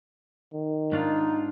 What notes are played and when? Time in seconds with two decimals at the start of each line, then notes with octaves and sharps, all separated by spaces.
0.53 D#3
0.92 G#2 D4 D#4 F4